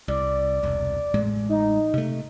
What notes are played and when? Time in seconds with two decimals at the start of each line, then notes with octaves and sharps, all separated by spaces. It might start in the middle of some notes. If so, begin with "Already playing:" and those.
0.08 C2 D5
0.63 E1 C2
1.14 A1 A2 G#3
1.49 D#4
1.94 C3 A3